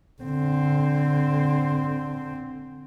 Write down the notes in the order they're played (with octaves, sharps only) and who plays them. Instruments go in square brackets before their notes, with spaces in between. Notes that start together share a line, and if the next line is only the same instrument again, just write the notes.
[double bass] D3 C4